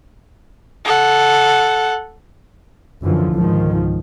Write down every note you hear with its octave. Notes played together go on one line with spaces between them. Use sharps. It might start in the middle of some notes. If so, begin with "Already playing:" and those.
A4 F#5
F#2 D3 E3 F3
C#2 G#2 D#3 F3